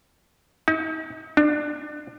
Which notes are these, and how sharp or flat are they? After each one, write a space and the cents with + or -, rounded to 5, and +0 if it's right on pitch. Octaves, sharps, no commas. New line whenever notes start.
D#4 +40
D4 +25